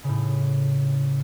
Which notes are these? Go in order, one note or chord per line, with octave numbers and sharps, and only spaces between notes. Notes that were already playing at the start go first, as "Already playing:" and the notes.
A2 C#3